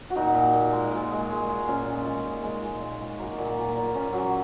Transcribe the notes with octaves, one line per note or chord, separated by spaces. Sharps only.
F#4
A#2 D#4
A#2
A#2
G#3
A#2
G#3
G#3
G#3
A#2 C#4
A#2
G#3
A#2
G#3
A#2
A#2
G#3
F#3 A#3
A#2
A#3
A#2
A#3
A#2
A#3
A#2 C#4
F#3